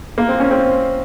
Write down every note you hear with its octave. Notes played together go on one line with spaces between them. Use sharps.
A#3
C4
C#4
C4